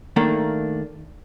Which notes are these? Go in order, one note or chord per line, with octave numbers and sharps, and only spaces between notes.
D#3 A3 A#3 D4